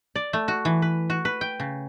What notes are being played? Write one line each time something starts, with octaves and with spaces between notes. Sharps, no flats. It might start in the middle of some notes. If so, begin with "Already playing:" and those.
D5
A3
F#4
E3
B4
F#4
B4
G5
C#3